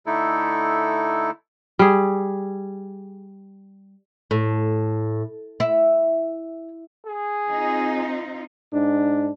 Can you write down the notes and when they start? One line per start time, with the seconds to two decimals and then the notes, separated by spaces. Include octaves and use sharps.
0.06 D3 A3 D#4 E4 A4
1.79 G3 G#4
4.31 A2
5.60 E4
7.07 G#4
7.49 C4 D#4 F4
8.74 G#2 D4